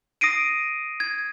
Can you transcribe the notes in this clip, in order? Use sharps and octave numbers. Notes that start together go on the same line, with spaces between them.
D#6 A#6 C7 D7 D#7
G#6